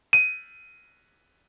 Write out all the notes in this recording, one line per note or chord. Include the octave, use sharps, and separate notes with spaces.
D#7